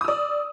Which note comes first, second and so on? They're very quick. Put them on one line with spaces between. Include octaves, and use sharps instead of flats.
D#6 E6 D5